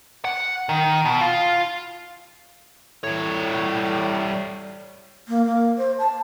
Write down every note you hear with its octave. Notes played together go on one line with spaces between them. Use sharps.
F#5
D#3
B2
F4
A2 G3 C#5
A#3
A#3
C5
A5